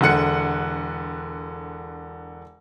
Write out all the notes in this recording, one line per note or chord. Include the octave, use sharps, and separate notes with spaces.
E1 D3 F#5 C#7